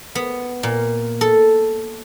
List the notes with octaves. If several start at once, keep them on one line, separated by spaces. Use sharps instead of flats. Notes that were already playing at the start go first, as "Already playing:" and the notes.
B3
A#2
A4